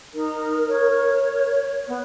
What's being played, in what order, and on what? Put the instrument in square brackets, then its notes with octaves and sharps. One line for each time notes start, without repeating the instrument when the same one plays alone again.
[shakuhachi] D#4 [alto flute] A#4
[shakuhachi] C#5
B3